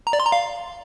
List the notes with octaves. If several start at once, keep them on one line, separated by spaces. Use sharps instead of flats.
A#5
D5
C6
A#5
F5